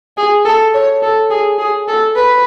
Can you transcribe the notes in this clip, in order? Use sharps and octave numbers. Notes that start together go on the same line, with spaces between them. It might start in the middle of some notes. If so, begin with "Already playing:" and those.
G#4
A4
C#5
A4
G#4
G#4
A4
B4